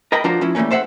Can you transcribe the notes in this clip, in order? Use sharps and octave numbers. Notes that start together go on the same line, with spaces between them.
A#4 D#5 G5 A#5 B5
F3 D4 F4 F#4 A#4 C5
F3 C#4 E4
E3 G3 A3 A#3 C#4
A4 C5 E5 F#5